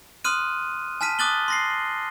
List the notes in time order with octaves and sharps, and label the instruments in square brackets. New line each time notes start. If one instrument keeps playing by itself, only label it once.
[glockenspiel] C6 D#6 F6 F#6 D#7
G#5 A5 F6 B6 D#7
D6 D#6 F#6 A6 F#7 G7
C6 A#6 C7